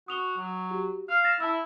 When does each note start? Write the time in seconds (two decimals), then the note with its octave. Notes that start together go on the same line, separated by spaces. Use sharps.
0.08 F#4 D#6 F7 G7
0.37 F#3
0.71 F#4 G4
1.09 F5 F6
1.24 A6 A#6 E7
1.40 E4 A5 E6